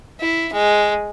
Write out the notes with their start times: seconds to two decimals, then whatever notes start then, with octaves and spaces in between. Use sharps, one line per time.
0.20 E4
0.53 G#3